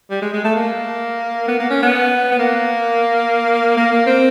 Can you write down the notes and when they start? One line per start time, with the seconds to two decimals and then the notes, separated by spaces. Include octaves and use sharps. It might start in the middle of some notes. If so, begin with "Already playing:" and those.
0.11 G3
0.22 G#3
0.34 G#3
0.45 A3
0.56 A#3
1.48 B3
1.60 A#3
1.70 C#4
1.82 B3
2.32 B3
2.39 A#3
3.77 A#3
3.92 A#3
4.07 C4